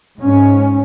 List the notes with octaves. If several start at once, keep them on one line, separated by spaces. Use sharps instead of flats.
G#2 C#4